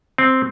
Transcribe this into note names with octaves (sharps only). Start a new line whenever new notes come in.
C4